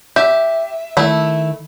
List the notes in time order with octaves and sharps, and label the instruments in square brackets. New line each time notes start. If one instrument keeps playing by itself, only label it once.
[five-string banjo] G4 [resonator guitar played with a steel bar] E5
[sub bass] D#3 [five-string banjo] A3 E4